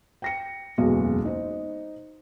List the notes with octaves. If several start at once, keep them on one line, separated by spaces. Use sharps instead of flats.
G5 A#6 C#7
F#1 B1 E2 G#3 F#4
D#4 C5